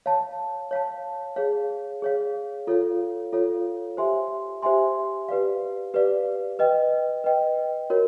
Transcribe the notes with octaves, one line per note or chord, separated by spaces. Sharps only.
C#5 F5 A5
C#5 F5 A5
G#4 C#5 F5
G#4 C#5 F5
F4 A4 C#5 F5
F4 A4 C#5 F5
G4 C5 E5 G#5 C6
G4 C5 E5 G#5 C6
G4 B4 D5 F5
G4 B4 D5 F5
B4 D#5 G5
B4 D#5 G5
F#4 A#4 C#5